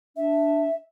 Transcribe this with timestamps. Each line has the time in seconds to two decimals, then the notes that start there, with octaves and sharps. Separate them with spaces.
0.16 D4 E5